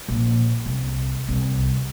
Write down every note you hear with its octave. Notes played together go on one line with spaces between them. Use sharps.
A#1
C2
C2